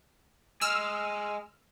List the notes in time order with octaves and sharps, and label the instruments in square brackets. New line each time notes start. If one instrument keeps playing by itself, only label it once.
[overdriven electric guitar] G#3 G#4 [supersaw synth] E6 F6